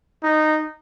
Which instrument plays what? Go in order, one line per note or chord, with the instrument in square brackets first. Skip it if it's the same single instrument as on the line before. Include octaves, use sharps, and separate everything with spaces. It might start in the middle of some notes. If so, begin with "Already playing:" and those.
[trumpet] D#4